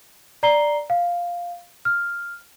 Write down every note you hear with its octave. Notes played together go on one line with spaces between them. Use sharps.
D5 A#5 C7 G7
F5
F6